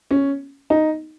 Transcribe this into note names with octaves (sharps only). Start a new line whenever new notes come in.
C#4
D#4